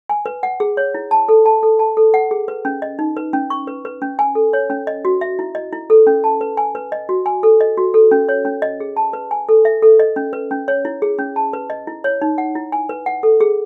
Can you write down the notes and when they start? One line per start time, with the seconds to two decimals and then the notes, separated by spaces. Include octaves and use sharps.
0.09 G#5
0.26 B4
0.43 F#5
0.60 G#4
0.77 C#5
0.94 E4
1.11 A5
1.29 A4
1.46 A5
1.63 A4
1.79 A5
1.97 A4
2.14 F#5
2.31 G#4
2.48 B4
2.65 C#4
2.82 D#5
2.99 D#4
3.17 B4
3.33 C#4
3.50 C#6
3.67 B4
3.85 B4
4.02 C#4
4.19 G#5
4.35 A4
4.53 C#5
4.70 C#4
4.87 D#5
5.05 F#4
5.21 E5
5.39 E4
5.55 D#5
5.73 E4
5.90 A4
6.07 C#4
6.24 A5
6.41 B4
6.57 G#5
6.75 B4
6.92 D#5
7.09 F#4
7.26 G#5
7.43 A4
7.61 D#5
7.77 F#4
7.94 A4
8.11 C#4
8.29 C#5
8.45 C#4
8.62 D#5
8.80 G#4
8.96 A5
9.13 B4
9.31 G#5
9.49 A4
9.65 E5
9.82 A4
9.99 D#5
10.16 C#4
10.33 B4
10.51 C#4
10.68 C#5
10.85 E4
11.02 G#4
11.18 C#4
11.36 A5
11.53 B4
11.70 D#5
11.87 E4
12.04 C#5
12.22 D#4
12.38 F#5
12.55 E4
12.72 G#5
12.89 B4
13.06 F#5
13.23 A4
13.40 G#4